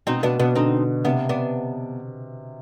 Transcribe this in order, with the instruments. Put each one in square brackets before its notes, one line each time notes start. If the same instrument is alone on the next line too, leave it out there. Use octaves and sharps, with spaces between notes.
[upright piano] B2 [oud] C4 D#4
[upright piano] B2 [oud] B3 D4
[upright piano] B2 [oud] B3 D4
[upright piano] D3 [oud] C4 D#4
[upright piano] C3 [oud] B3 D4
[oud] B3 D4